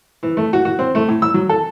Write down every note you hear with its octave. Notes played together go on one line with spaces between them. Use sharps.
E3
A3
F#4
F#4
C4
A3
A2
E6
F#3
A4